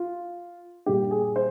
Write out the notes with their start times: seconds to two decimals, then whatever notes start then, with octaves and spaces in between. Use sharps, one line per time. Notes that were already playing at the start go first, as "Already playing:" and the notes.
Already playing: F4
0.86 A#2 G3 A#3 G4
1.11 G#4
1.36 C5